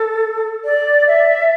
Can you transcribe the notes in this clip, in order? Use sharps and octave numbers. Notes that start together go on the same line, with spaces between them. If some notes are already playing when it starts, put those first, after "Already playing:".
Already playing: A4
D5
E5